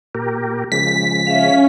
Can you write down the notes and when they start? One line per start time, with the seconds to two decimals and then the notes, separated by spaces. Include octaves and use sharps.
0.15 A#2 G4 A#4
0.72 C#3 F3 G#3 B6
1.27 C#4 E5 F5